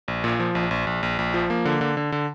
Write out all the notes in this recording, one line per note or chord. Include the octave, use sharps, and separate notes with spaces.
A#1
A#2
F3
A#1
A#1
A#1
A#1
A#1
F3
A#3
D3
D3
D3
D3